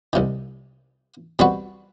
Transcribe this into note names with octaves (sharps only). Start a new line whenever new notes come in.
C2 C3 D#3
B2 G3 C4 F#4 B4